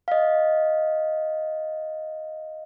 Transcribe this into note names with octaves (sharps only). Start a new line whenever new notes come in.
D#5 F5